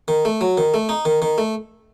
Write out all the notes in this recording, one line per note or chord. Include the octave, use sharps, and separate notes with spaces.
D#3
A3
F#3
D#3
A3
D#4
D#3
D#3
A3